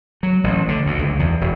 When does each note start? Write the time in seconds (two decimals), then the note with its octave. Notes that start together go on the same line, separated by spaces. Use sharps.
0.23 F#3
0.44 A1
0.68 D3
0.86 D2
0.99 C#2
1.19 E2
1.41 E1